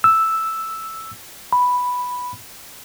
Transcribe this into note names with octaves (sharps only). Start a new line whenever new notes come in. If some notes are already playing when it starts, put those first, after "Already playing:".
E6
B5